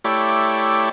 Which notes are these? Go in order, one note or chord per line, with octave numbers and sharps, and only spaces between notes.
A3 E4 G4 C#5 D5